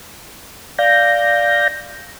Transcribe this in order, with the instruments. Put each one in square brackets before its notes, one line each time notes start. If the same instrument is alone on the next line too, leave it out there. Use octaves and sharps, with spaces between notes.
[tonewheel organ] D5 F5 G6 A#6